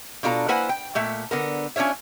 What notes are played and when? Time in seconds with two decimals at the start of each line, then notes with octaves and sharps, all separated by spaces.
0.23 B2 D4 F4 A4 A#5
0.48 A#3 E4 B4 C5 F#5 G#5
0.69 G5
0.95 A#2 A3 E5
1.31 D3 B3 A#4
1.76 C#4 D4 F4 C#5 E5